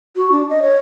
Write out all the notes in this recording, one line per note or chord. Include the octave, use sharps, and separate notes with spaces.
F#4
D4
D#5
C#5